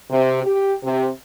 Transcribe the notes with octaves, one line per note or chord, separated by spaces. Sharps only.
C3
G4
C3